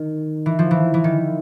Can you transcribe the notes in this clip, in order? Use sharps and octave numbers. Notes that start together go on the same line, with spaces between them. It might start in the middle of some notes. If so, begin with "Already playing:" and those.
Already playing: D#3
E3
F3
E3
E3
D#3